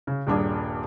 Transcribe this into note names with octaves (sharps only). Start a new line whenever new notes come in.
C#3
D#1 G2 D4 G#4